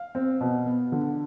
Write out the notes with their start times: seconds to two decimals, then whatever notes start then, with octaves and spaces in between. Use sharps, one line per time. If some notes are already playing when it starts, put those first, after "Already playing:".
Already playing: F5
0.15 C4
0.41 B2
0.66 B3
0.92 D3